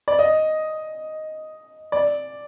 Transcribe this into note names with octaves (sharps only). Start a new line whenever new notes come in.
D5
D#5
D5